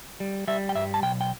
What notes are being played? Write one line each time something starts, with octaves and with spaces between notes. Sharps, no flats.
G3
G3 E5
G5
G2 E5
A5
B1 G5
G5